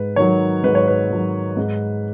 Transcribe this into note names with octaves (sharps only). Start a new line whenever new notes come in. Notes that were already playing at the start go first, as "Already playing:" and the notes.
Already playing: G#2 B4
D#3 F#3 C#5
G#2 B4
C#5
B4
D#3 F#3
G#2